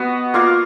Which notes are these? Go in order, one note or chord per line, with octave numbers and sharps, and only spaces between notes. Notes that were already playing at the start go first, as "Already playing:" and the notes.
Already playing: B3 F#4 B4 D#5
A#3 F4 A#4 F5